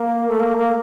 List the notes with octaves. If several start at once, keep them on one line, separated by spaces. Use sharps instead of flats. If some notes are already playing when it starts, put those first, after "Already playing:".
Already playing: A#3
A3
A#3
A#3